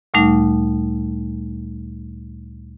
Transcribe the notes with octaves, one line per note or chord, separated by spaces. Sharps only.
D2 A#2 G3 A3 D#4